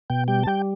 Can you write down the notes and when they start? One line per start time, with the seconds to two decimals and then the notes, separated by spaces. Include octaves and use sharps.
0.10 B2 G5
0.28 G3 G5
0.43 A5
0.47 G3 G5